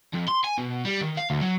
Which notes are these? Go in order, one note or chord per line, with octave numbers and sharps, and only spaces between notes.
F2
C6
G#5
B2
G3
D#3
F5
D2
F#3